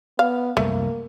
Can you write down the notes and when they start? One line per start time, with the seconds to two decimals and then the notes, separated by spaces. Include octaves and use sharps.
0.19 B3 F5
0.57 C2 F#2 A3 A#3